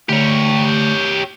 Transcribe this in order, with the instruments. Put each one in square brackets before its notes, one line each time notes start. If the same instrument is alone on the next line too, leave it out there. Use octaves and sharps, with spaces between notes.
[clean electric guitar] D2 [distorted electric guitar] G4 C#5